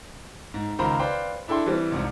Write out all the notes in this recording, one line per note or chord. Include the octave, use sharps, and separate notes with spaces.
G#2
C#2 D#3 F4 C5 A#5 B5
B4 C5 D5 F5 G5
D4 E4 A4 G5 C6
E3 G3 C4
C2 F2 G#2